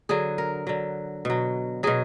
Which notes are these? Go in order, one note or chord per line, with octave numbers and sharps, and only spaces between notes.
D3 F#3 G#4
A#4
D3 F#3
B2 F#3
B2 F#3 G#4